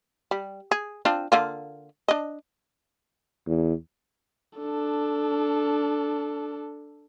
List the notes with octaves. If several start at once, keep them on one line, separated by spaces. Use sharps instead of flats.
G3
G#4
C4 D4 F4
D3 A#3 F4
D4 D#5
E2
D4 A4